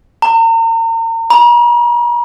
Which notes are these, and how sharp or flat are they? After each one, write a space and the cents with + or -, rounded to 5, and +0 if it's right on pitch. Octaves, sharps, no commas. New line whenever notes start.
A#5 -40
A#5 +45